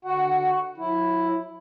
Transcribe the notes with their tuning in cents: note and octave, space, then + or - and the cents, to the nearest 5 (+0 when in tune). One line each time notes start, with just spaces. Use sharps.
D3 +0 F#4 +0 F#5 +20
F#3 -35 E4 +0